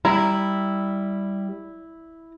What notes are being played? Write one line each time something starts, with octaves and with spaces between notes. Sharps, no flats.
G3 E4 A#5